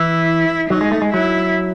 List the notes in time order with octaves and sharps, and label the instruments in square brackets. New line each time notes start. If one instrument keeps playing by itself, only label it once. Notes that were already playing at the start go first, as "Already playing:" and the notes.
Already playing: [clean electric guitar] E3 [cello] E4
[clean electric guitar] F#3 [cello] D#4
[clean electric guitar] G#3
A3
G#3
[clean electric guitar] F#3 [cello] E4